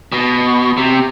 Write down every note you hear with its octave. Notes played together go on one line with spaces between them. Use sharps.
B2
C3